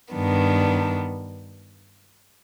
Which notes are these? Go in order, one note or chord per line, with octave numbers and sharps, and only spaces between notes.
G2 D#3 B3 D4